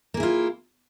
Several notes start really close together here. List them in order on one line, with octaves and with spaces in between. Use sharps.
A#3 G#4 E4 F4